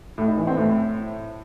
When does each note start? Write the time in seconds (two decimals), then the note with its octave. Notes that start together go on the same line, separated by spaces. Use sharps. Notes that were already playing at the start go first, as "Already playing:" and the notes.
0.18 A2
0.28 D#4
0.37 E3
0.47 C4
0.57 A2